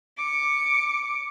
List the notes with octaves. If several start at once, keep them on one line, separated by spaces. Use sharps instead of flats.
D6 C#7